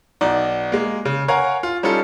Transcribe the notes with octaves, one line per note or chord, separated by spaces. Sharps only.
B1 D#4 D5
G#3 A#3
C#3
A#4 C#5 F5 F#5 G#5 A#5
F4
G3 C#4 D#4 F4 A4